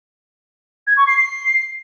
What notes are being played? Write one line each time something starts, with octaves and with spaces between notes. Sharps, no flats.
G#6
C#6
C7
C7